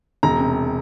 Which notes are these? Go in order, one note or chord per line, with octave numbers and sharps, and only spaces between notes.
E1 A#5
C3